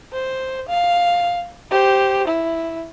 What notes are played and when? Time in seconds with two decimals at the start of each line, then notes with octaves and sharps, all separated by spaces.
0.12 C5
0.68 F5
1.71 G4 C5
2.27 E4